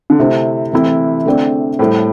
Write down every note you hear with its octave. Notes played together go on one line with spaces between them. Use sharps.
D3
C3 A3 E4 C5
C3 E3 A3 C4 E4
D3 A3 C4 A4 D5
A2 G3 E4 A4 C5